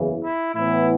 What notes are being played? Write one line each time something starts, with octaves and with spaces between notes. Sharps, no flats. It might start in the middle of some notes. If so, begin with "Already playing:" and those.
Already playing: F#1 E2 C#3 E3
E4
A2 E3 B3 E4